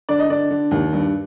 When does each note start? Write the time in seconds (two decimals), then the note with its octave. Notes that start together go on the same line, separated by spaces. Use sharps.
0.09 D3 D5
0.19 D#5
0.29 D3 D5
0.51 D3
0.71 D#2
0.93 G2